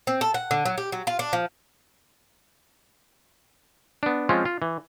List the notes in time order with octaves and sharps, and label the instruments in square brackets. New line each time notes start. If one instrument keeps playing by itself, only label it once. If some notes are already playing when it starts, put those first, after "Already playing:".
[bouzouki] C4
A4
F#5
D3
F#3
G4
F#3
F4
D4
F3
[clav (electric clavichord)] B3 D4
F3 G#3 C4 C#4 F4
F4
E3